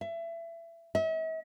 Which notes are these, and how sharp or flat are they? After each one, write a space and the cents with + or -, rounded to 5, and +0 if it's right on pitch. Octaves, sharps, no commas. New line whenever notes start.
E5 +25
E5 -45